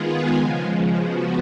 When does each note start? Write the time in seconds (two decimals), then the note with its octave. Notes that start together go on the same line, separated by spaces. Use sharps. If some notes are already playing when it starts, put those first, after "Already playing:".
Already playing: D#3 G#3 B3 F4 G#4
0.37 C#3 F3 G#3
0.98 F3 B3 F#4